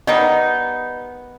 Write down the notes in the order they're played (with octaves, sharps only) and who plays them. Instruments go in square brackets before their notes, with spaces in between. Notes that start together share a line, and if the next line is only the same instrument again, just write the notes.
[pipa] D#3 G3 D#4 [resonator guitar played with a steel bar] B3 [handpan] D#5